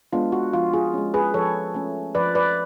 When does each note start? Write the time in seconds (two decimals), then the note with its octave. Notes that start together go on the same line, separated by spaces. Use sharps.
0.13 G#3 B3 D4 F4
0.32 F#4
0.53 F3 F4
0.73 F4 G#4
0.94 G#3 C#4
1.14 G#4 B4
1.34 F3 A4 C#5
1.74 A3 C#4
2.15 F3 B4 D5
2.35 B4 D5